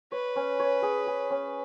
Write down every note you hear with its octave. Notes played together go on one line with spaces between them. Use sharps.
B4 C#5
C#4
C#5
G#4
G#4
C#4